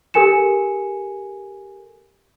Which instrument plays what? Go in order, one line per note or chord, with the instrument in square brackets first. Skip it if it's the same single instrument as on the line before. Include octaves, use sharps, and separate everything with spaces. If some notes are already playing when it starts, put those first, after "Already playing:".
[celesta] G4 A4 A#4 G#5 C#7 E7